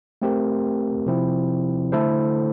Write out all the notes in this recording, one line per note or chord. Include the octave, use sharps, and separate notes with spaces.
A3 C4 G4 A#4
C3 F3 C4 E4
D3 A3 E4 A4 C5